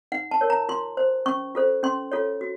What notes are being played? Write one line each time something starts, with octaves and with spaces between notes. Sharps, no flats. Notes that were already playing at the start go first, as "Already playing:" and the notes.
D#4 F#5
A5
A#4 C#5
A#5
F4 C6
C5
C#4 C#6
F4 A4 C5
C#4 C6
F4 A4 C#5
F#4